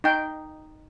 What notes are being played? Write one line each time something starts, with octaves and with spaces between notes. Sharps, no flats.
D#4 G5